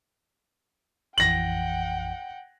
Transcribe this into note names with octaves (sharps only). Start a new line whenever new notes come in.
A1 F2 E3 F#5 G5 A#6 F#7